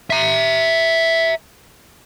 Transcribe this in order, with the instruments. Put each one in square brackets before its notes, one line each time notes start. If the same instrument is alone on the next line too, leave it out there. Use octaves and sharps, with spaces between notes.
[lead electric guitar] E5 A#5